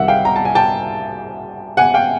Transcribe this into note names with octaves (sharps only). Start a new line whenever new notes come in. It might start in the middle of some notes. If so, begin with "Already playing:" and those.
Already playing: C2 C3 D#3 E5 F#5
F5 G5
A#5
A5
G#5
G5 A5
F#5 G#5
F5 G5